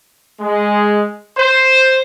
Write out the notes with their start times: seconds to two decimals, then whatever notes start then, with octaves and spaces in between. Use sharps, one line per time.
0.41 G#3
1.37 C5